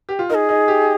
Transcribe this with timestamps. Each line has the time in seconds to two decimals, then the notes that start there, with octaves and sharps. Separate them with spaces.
0.09 G4
0.19 F4
0.30 D#4 A#4
0.35 G#4
0.49 D#4
0.68 G4